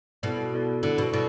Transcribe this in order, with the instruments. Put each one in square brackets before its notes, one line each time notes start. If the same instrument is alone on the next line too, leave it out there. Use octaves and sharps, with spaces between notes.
[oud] B2 [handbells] B3 E4 A4 D5
[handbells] B3 E4 A4 D5
[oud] D3 [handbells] E4 A4 D5
[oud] B2
[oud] B2 [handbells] E4 A4 D5